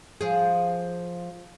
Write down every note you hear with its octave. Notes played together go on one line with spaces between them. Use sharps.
F3 G#4